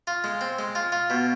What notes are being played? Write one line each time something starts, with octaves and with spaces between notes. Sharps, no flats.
F4
G#3
C4
G#3
F4
F4
B2